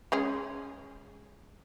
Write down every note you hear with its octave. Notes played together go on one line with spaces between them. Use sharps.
G#3 C#4 G#4